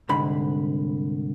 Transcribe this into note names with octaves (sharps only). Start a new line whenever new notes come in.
C2 G#2 D3 B5